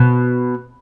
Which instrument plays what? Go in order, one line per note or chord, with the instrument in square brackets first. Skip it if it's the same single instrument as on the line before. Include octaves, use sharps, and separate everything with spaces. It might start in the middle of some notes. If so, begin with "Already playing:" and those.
Already playing: [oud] B2